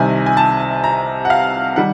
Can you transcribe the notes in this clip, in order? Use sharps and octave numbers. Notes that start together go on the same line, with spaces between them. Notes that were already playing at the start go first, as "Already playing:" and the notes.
Already playing: C2 C3 D#3 G#5
G#5
A5
A#5
F#5
F5
D#3 G3 F#5